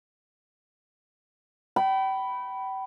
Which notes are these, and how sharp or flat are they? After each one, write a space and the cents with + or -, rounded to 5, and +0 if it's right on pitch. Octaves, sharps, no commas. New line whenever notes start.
G5 -35 B5 +0